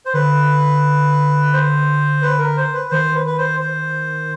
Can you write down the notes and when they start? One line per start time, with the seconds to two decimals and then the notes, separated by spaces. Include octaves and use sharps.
0.06 C5
0.13 D3 B4
1.53 C5
2.22 B4
2.38 A#4
2.57 C5
2.73 B4
2.91 D#3 C5
3.15 B4
3.26 B4
3.38 C5
3.60 C5